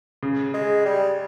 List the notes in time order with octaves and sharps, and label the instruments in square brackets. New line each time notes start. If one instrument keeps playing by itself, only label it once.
[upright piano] C#3
[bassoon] G#3
G3